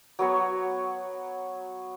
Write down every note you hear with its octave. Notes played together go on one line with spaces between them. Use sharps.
F#3 B3 C#5